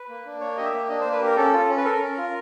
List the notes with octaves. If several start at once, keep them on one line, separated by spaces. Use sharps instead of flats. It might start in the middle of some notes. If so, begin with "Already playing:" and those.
Already playing: B4
A#3
D4
A#3 C#5
G4 D#5
E5
A#3
D4 D#5
C5
A#3
B4
G4 A#4
C#4 A4
F4
C#4
B4
A4 A#4
C#4
F4